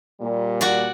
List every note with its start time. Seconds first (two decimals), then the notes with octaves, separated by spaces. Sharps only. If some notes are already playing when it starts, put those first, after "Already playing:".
0.20 A#2 G3
0.61 F#4 D5